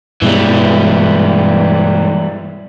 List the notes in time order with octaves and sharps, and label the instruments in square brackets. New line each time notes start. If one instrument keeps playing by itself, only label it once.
[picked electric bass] G2 B2 G#3 [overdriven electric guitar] E3 G3